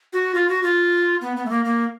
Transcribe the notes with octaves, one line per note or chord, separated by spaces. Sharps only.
F#4
F4
F#4
F4
B3
B3
A3
A#3
A#3